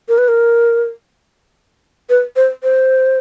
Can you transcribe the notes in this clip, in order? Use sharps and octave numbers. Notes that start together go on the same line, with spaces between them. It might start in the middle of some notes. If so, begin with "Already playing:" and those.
A#4
B4
A#4
B4
C5
C5